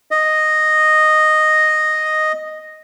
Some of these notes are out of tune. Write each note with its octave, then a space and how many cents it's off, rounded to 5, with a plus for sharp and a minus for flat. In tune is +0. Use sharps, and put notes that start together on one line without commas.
D#5 -5